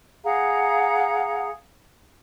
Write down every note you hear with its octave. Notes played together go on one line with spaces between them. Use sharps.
G#4 F5 F#5 A#5